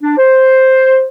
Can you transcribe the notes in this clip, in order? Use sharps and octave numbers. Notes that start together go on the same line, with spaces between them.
D4
C5